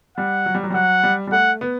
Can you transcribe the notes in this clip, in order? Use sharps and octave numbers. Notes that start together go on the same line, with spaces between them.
G3 F#5
F#3
G3
F#3
G3
F#3 F#5
G3
G3
A3 F#5
B3